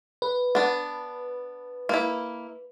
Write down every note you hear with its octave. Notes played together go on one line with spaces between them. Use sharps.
B4
B3 D4
A#3 E4